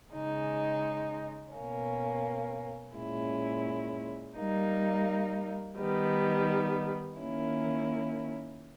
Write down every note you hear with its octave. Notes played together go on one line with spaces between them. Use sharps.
C#3 G#3 D#4
B2 A#3 C#4
A#2 G#3 C#4 E4
G3 A#3 D#4
D#3 G3 B3 D#4
D#3 A#3 C#4 E4